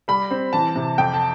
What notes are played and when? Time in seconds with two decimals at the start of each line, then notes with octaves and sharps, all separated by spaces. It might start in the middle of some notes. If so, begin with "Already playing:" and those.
0.08 G3 B5
0.31 C4
0.53 E3 A5
0.76 C3
0.98 F2 G5
1.14 A5